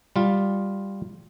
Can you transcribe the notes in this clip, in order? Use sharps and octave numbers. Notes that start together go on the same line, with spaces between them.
G3 F4